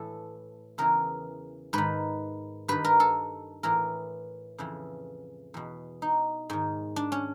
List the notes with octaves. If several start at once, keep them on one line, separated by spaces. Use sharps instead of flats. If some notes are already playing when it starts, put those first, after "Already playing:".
Already playing: A2 E3 A4
E2 C#3 E3 A#4
G#2 D#3 B4
G2 D#3 B4
A#4
A4
A2 E3 A#4
F2 C#3 E3
E2 B2
D#4
G#2 D#3
D4
C#4